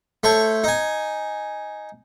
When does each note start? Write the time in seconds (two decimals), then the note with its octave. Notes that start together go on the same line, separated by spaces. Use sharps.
0.23 A3 C5 C#5 C#6
0.64 D#4 G#5